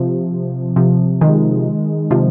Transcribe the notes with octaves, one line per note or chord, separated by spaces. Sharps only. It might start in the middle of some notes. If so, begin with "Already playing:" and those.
Already playing: C3 F3
C3 F3
D#3 G#3
C3 F3